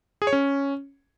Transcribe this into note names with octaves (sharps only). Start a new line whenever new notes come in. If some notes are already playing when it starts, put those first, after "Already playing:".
G#4
C#5
C#4